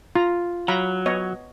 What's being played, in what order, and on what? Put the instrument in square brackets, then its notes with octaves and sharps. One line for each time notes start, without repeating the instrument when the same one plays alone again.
[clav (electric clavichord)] F4 [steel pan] A#5
[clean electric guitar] F#3 [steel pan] F5 A#5 B5
[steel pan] B3 C#5 D#5